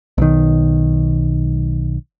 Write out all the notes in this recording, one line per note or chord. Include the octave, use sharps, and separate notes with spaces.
B1 D#3